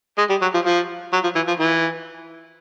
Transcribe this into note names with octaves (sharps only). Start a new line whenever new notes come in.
G#3
G3
F#3
F3
F3
F#3
F3
E3
F3
E3